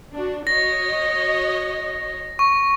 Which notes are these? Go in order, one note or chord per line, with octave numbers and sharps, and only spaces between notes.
D4 F#4
F#4 C#5 D#5 A#6
C#6